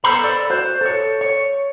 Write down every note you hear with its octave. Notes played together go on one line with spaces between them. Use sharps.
B3 A4 C5 A#5 B5
A4 D5
F#4 C5
A4 C#5
C#5